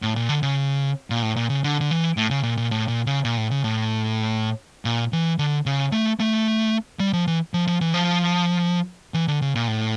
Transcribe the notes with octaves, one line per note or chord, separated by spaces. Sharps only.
A2
A#2
D3
C#3
A#2
A2
A#2
C#3
D3
D3
E3
A2
C#3
A#2
A#2
A2
A#2
C#3
A#2
A2
C#3
A2
A#2
E3
D3
C#3
A3
A3
G3
F3
E3
F3
F3
E3
F3
E3
D3
C#3
A#2
A2